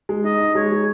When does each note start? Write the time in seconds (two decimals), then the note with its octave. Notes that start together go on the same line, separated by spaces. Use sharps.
0.09 G#3
0.24 D#4 D#5
0.41 D#4
0.55 G#3 C#5
0.72 G#3